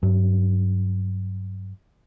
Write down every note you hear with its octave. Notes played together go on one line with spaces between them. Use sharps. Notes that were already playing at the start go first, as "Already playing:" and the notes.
G2 F#3